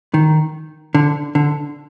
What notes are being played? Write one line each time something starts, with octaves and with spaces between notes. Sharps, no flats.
D#3
D3
D3